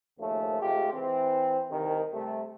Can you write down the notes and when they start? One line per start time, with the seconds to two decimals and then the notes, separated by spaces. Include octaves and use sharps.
0.19 A#1 D#2 C#3 F3 A3
0.61 C3 G#3 A3 F4 G4
0.92 E3 C4
1.71 C2 D#3
2.12 C3 G3 A3